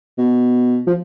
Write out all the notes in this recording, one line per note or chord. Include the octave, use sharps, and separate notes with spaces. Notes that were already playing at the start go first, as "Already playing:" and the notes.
B2
F3